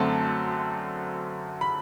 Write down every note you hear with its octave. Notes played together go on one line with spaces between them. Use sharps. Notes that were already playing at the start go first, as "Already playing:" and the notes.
Already playing: F#2 D3 A3 C4 A5
B5